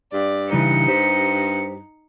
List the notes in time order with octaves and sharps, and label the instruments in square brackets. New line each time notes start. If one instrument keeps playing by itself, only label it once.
[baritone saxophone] G2 [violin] D5
[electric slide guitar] C#3 E3 G3 [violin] D#4 C#7
[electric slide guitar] G4 C5